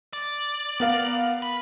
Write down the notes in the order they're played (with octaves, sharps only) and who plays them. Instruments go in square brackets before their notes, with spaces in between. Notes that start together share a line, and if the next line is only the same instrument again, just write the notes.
[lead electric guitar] D5
[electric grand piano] B3 A#4 F5
[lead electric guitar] B4